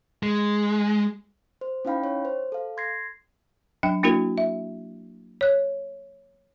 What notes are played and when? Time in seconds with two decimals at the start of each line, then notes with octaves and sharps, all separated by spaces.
0.23 G#3
1.61 C5
1.85 C#4 D#4 E4 F5 G5 B5
2.04 C#5
2.25 C5
2.52 A4 F5
2.77 C6 G#6 A#6 C7
3.83 F#3 D4 G5
4.03 A#3 D4 E4 F#4 A#4
4.38 E5
5.41 C#5 F#6